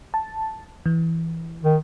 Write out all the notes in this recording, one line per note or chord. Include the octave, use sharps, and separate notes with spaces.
A5
E3
D#3